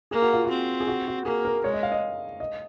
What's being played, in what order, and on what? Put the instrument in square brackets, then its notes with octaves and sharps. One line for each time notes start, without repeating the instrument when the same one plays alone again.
[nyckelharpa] A#3 [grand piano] G#4
[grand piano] F#4
F4
F#4
[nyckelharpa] C4
[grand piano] G#4
F#4
F#4
[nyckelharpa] A#3 [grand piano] G#4
[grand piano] A#4
[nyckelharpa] G#3 [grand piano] C#5
[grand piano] D#5
F5
D#5
D#5